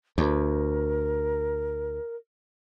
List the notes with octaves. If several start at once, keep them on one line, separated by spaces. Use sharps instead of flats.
D2 A#4